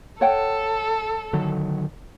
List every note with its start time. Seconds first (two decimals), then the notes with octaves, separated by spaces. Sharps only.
0.21 A4 C#5 F#5 G5
1.33 D3 D#3 F#3